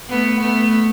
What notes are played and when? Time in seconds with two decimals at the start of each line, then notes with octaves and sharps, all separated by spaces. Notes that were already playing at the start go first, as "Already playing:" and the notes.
0.09 A3 B3
0.40 A3 B3